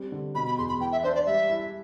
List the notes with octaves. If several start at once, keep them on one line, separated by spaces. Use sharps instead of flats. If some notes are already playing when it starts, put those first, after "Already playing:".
Already playing: G3 C4
D3
B2 B5
B5
E2 C6
B5
E3 G5
E5
D4 C5
D5
G3 E5
E4